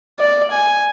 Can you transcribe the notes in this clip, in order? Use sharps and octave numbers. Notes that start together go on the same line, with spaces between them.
D5
G#5